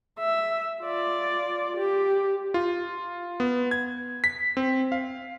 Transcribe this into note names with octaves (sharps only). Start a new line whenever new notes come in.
E5
F4 D5
G4
F4
B3
G#6
B6
C4
F5